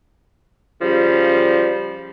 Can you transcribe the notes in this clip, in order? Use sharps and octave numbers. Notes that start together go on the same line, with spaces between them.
C#3 F3 G3